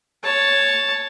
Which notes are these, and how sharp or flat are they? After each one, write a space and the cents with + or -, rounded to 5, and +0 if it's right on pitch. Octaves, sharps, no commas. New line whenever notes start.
C#5 +0 A5 +0